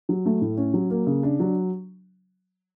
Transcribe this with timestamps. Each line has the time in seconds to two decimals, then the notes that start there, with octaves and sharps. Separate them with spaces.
0.09 F#3
0.26 A3
0.42 A2
0.57 C#4
0.74 F#3
0.90 A#3
1.07 C#3
1.23 D4
1.40 F#3